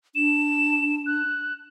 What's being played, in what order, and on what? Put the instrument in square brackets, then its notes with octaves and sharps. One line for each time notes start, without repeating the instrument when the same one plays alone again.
[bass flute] D4 [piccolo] E7
[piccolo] F#6